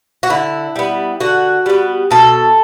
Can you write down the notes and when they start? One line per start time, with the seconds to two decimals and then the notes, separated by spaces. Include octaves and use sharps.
0.23 F#4
0.30 D3 E4
0.76 G3 B3
1.20 D3 F#4
1.66 G3 B3
2.11 B2 A4